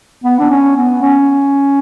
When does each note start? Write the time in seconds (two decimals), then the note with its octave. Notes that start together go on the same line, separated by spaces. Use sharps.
0.24 B3
0.39 D4
0.50 C#4
0.76 B3
1.02 C#4